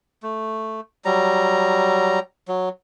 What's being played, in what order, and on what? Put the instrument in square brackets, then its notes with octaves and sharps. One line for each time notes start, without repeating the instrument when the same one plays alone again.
[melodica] A3
F#3 G3 A#5
F#3